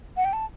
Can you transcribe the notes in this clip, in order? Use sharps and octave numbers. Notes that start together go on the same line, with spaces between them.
F#5
G5
A5